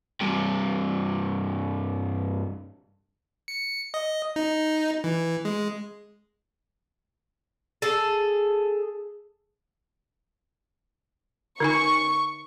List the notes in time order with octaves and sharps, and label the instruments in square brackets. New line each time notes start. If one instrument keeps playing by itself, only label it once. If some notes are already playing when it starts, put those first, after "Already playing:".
[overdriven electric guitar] G2 C3
[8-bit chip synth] C#7
D#5
D#4
E3
G#3
[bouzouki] G#4 A4
[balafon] D3 D#4 G#5 [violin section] C#6